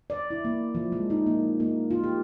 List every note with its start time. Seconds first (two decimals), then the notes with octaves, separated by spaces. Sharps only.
0.10 D5
0.30 E4
0.45 A#3
0.75 F3
0.92 G#3
1.10 D#4
1.27 A#3
1.60 A#3
1.91 F4
2.04 G4